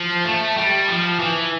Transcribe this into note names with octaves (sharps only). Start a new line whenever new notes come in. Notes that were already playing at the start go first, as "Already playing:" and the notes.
Already playing: F3
A3
G3
F3
E3